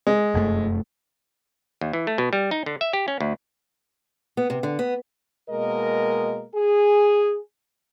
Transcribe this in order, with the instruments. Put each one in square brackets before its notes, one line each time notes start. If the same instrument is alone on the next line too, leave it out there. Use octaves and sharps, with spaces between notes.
[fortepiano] G#3
[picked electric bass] F1 F#2 A3
[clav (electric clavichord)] D#2
E3
A3
B2
G3
D#4
D3
E5
G4
C#4
D2
[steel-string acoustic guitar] B3
C3
D3
B3
[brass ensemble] B2 G#3 A#3 A#4 D#5
G#4